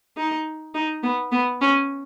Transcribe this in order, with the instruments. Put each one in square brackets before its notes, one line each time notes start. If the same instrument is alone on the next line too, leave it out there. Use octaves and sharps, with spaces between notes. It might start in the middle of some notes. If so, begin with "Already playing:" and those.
[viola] D#4
D#4
B3
B3
C#4